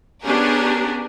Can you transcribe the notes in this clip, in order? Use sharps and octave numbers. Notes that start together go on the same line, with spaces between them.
B3 C#4 D4 G4 G#4 A#4